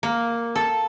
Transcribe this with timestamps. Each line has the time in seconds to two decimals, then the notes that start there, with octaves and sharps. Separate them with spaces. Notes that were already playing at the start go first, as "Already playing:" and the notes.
0.03 A#3
0.55 A4